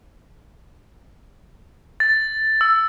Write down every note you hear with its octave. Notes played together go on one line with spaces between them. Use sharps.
A6
E6